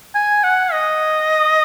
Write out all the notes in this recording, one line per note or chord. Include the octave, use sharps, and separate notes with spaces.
G#5
F#5
D#5